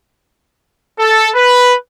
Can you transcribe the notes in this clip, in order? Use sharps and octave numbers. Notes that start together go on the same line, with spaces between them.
A4
B4